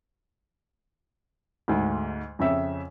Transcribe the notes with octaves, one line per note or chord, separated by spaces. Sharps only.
D2 G#2
F2 C#3 E5